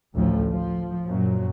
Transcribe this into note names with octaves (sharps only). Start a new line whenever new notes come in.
A1 D2 A2 F3
F3
F#2 A#2 F#3